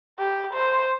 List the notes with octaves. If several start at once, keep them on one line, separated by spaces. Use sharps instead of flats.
G4
C5